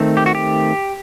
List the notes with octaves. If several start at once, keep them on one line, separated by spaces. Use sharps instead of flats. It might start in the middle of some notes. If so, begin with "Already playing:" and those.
Already playing: D#3 A3 C4
G4
F#4
G4